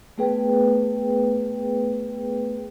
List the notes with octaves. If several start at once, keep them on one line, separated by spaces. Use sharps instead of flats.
A3 B3 G#4 B4 G5